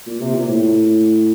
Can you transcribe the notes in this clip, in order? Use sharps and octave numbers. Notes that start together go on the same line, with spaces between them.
A#2
C3
A#2
A2